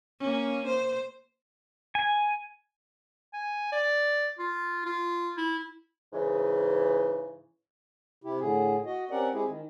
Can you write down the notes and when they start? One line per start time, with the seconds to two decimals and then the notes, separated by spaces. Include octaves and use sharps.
0.20 A#3 C#4
0.67 C5
1.95 G#5
3.33 G#5
3.72 D5
4.39 F4
4.86 F4
5.38 E4
6.13 G#2 C#3 E3
8.24 C3 E4 G4
8.40 A2 D3 G#4
8.86 F#4 D#5
9.11 C4 C#4 G4 A#4 D5 F#5
9.33 G#3 C4 E4 G4 G#4
9.48 D#3